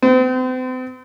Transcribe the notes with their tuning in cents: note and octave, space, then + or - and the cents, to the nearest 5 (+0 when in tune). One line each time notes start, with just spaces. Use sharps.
C4 -40 C5 -35